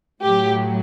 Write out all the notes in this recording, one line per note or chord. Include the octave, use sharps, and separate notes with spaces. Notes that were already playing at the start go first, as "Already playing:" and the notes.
A2 F#3 G4